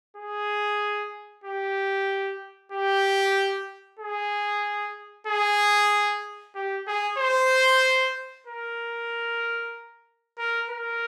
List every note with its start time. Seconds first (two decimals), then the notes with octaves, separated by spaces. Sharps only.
0.17 G#4
1.44 G4
2.72 G4
3.99 G#4
5.27 G#4
6.55 G4
6.87 G#4
7.18 C5
8.47 A#4
10.38 A#4
10.70 A#4